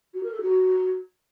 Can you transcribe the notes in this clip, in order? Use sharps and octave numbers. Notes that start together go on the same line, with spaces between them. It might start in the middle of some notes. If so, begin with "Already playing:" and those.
F#4
A#4
A4
F#4